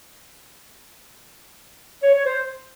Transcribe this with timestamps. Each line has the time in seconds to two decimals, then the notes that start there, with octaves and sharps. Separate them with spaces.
2.03 C#5
2.15 C#5
2.26 C5